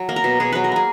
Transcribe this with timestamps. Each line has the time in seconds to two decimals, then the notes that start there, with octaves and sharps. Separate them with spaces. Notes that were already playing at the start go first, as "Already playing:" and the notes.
Already playing: F#3
0.09 A#3
0.16 A#4
0.24 B2
0.40 B2 G#4
0.52 F#3 B4
0.64 A#4
0.72 A#3 G#4